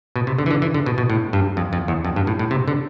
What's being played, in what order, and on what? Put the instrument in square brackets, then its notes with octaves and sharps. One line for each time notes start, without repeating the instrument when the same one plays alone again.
[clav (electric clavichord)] B2
C3
D3
E3
D3
E3
D3
B2
B2
A2
G2
F2
F2
E2
F2
G2
A2
A2
C3
D3